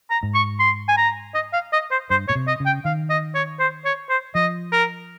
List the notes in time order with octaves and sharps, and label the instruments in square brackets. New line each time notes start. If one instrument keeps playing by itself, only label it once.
[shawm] A#5
[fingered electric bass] G#2
[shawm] C#6
C6
G#5
A#5
D#5
F5
D#5
C5
[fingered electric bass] G2 [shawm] C5
[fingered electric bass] A#2 [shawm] C#5
[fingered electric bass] C3
[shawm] D#5
[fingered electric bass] C#3
[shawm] G5
[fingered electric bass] D#3 [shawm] F5
[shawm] D#5
C#5
C5
C#5
C5
[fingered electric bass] F3 [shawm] D#5
[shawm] A#4